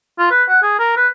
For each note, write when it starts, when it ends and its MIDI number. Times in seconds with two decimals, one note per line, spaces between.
0.19 0.26 65
0.31 0.43 71
0.48 0.59 78
0.63 0.78 68
0.80 0.97 70
0.97 1.07 71